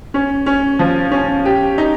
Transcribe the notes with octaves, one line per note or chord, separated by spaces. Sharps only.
C#4
C#4
F3
C#4
G4
D#4